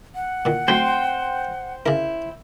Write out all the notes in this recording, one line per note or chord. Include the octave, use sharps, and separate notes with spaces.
F#5
A#2 D#3
F#3 A3 C4 C5 G5
C#3 E4 A#4